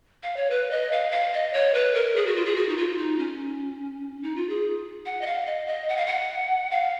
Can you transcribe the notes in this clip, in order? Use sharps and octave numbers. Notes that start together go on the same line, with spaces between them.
F5
C#5
B4
D#5
F5
F5
D#5
C#5
B4
A#4
G#4
F#4
F4
G#4
F#4
D#4
F4
D#4
C#4
D#4
F4
G#4
F#5
D#5
F5
D#5
D#5
F#5
F5
F#5
F5